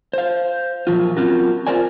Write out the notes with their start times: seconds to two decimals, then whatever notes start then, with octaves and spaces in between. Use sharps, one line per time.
0.13 C5 F5
0.87 A#2 F3 F#3 F4
1.16 F#3 C4 C#4 F4 F#4 A#4
1.67 F4 A#4 C5 D5 G#5